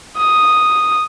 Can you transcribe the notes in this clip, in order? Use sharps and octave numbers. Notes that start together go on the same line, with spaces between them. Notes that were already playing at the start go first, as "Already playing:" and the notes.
D#6